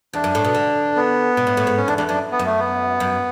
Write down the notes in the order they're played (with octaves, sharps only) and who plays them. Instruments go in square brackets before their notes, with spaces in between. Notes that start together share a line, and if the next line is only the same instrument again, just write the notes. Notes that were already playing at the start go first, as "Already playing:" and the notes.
[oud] E2 [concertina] D4
[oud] F#2
A2
B2
D3
[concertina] B3
[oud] B2
A2
A2
G#2
[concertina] C#4
[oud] E2 [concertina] D4
[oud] E2 [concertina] D4
[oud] F#2 [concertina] D4
[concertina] B3
[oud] F#2
[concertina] A3
B3
[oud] F#2